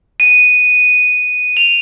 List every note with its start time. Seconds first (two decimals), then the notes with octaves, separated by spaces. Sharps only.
0.20 D#7
1.57 F7